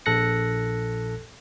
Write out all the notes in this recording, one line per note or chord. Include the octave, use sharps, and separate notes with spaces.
A#1 A4 F#6 A#6 C#7